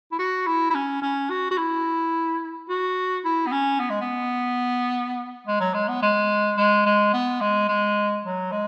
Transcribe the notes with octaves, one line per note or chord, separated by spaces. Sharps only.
E4
F#4
E4
E4
C#4
C#4
F#4
F#4
E4
F#4
E4
B3
C#4
B3
G#3
B3
G#3
F#3
G#3
B3
G#3
G#3
G#3
B3
G#3
G#3
F#3
G#3